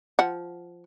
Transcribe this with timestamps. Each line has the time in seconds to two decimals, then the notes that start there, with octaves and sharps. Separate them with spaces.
0.19 F3 F#5